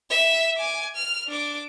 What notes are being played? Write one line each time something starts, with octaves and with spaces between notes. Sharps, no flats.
E5
G#5 D6
F6
D4 D6